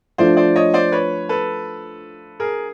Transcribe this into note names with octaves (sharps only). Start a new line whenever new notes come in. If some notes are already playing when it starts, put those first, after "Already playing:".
F3 A3 D4 F4 C5 D5
C5 D5
C#5 D#5
C5 D5
B4 C#5
A4 B4
G#4 A#4